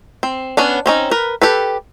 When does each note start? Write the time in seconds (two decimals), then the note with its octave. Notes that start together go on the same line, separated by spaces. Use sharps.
0.23 C4
0.57 B3 C#4 D4
0.86 C4 C#4 D#4
1.11 A#4 B4
1.42 G4 A4 B4